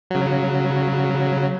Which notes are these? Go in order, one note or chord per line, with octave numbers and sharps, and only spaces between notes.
C#3 F#3